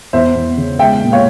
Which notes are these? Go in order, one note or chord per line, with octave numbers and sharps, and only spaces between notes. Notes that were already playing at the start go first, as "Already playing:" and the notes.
E2 C5 E5
E2
C#3
G#3 E5 G5
A#2
C#5 F5